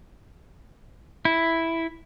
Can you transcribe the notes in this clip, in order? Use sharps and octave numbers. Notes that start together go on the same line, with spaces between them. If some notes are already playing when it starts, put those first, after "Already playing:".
E4